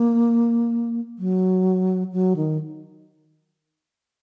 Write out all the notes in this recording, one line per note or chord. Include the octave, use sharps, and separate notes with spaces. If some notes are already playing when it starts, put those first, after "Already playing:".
Already playing: A#3
F#3
F#3
D#3